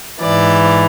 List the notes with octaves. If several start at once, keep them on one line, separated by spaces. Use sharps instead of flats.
G#2 E3 D5